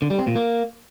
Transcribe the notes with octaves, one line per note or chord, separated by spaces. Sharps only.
D3
G3
C4
A#2
A#3